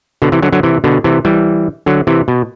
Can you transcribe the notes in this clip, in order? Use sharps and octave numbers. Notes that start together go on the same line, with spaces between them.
B2 D3
C3 E3
D3 F#3
D3 F#3
C3 E3
B2 D3
C3 E3
E3 G3
D3 F#3
C3 E3
B2